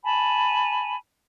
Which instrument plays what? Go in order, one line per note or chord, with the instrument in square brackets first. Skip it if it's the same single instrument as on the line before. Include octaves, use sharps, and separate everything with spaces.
[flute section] G#5 A5 B5